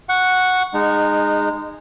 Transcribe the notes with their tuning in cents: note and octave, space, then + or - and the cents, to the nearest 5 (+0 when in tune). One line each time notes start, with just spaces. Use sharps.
F#5 -5 C#6 +0
G#3 -10 D#4 -25